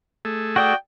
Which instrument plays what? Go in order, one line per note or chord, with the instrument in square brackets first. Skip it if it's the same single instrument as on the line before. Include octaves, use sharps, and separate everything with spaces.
[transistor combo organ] A3 G#4 A4
[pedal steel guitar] F#4 D5 D#6 [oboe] G5